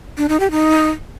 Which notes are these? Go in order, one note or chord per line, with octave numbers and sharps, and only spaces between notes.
D4
D#4
G4
D#4